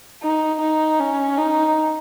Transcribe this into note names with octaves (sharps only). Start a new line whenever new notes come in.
D#4
D#4
C#4
D#4